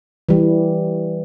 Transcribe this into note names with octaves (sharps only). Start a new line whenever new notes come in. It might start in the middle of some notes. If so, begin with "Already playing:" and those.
E3 G3